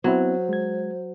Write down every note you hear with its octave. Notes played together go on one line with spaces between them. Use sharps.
F#3 B3 C4 E4 C5
G#3 G#6